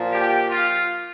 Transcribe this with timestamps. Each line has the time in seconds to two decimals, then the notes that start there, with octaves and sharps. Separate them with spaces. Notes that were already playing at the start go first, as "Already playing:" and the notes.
Already playing: A#2 F3
0.11 G4
0.48 F4